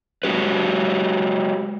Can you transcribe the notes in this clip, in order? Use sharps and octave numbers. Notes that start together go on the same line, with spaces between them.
G#3 F#4 G4 B4